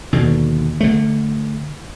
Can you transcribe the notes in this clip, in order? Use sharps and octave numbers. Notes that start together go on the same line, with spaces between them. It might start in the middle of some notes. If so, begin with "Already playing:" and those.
D#2 B2 D3
D3 A3